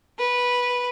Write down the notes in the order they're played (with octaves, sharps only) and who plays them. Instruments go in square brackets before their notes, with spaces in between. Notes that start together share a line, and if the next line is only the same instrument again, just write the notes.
[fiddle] B4